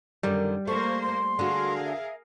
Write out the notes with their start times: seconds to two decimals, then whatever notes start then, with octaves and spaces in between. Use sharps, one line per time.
0.23 F#2 D3 D#3 G3
0.68 A3 A#3 C5 C#6
1.01 C6
1.39 D3 F#4 G#4 A#4 F5
1.85 E5